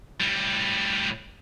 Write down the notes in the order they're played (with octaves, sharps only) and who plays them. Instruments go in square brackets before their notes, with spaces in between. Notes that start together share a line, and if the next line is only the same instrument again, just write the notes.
[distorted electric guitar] A2 G3